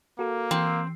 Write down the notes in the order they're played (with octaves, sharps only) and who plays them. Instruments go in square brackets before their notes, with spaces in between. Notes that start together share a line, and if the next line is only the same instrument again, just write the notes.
[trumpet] A#3 [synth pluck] F#4 A4
[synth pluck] E3 C7 [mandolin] C4